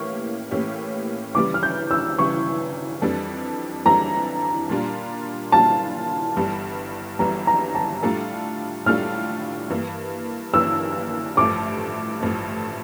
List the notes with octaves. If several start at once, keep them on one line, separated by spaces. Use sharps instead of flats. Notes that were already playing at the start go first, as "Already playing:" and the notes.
Already playing: A2 E3 A#3 C#4 G4 C#6
A2 E3 A#3 C#4 G4
C#3 E3 G3 D6
F6
G6
E6
C#3 E3 G3 C#6
F2 E3 G3 D4 A4
F2 E3 G3 D4 A4 A#5
A#2 G3 D4 F4
A#2 G3 D4 F4 A5
G1 G2 E3 G3
G1 G2 E3 G3 A#5
A#5
A5
A2 G3 D4 F4 A4
A2 G3 D4 F4 A4 F6
G2 E3 A#3
G2 E3 A#3 E6
A1 G2 F3 A3 D6
A1 G2 F3 A3